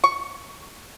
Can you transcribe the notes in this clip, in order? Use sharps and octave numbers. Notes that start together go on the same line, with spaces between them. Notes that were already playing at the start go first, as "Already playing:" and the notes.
C#6